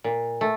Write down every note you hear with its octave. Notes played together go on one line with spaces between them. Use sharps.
A#2
A3